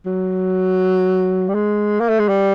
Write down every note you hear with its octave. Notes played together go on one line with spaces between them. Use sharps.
F#3
G3
G#3
A#3
A3
G#3
G3